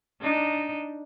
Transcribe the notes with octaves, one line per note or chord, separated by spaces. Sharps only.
D4 D#4